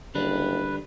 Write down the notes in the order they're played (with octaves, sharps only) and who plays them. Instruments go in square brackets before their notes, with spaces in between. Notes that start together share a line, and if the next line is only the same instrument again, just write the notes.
[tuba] F#1 [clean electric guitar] D3 G3 D4 [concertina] B4